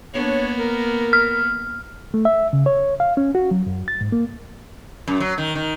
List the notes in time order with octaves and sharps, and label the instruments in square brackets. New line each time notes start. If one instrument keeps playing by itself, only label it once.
[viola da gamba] A#3 B3 [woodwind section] D4 C#5
[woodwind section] A#4
[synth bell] F6
[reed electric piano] A3
E5
C#3
C#5
F5
C#4
F#4
F#3
F#2
A6
G#2
A#3
[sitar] F#2
F#3
D#3
D#3